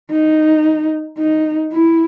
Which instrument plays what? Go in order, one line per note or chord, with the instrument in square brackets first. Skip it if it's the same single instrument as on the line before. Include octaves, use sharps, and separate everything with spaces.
[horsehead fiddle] D#4
D#4
E4